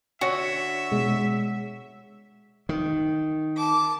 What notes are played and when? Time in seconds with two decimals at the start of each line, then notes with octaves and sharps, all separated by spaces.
0.21 D3 F#4 C#5 E5
0.92 B2 G#3
2.69 D#3
3.57 A5 D6